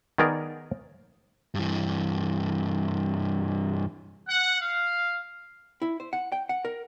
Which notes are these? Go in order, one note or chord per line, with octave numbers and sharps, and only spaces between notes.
D#3 B3 G#4 A#4 D5
G2 E3
F#5
F5
E4
C5
F#5
G5
F#5
A#4